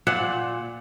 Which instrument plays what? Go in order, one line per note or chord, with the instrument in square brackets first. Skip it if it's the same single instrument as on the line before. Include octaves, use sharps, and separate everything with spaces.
[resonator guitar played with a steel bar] A#2 [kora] F#5